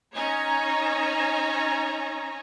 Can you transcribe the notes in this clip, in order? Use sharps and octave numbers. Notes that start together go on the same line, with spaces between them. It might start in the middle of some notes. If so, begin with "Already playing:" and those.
C#4 D#4 C#5 G#5 A#5